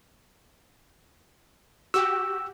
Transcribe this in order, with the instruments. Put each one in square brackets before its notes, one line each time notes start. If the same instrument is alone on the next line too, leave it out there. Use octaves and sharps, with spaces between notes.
[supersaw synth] F#4 G4 [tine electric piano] E6